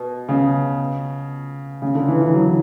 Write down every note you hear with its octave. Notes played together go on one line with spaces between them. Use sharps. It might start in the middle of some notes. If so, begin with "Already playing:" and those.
Already playing: B2
C#3
C#3
D3
E3
E3
F#3